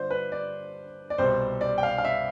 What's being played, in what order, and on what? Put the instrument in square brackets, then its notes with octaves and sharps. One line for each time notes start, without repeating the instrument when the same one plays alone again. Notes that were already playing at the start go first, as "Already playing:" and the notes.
Already playing: [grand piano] D3 G3 F4 C5 D5
B4
D5
D5
C2 B2 G3 C4 C5
D5
G5
F5
F5
E5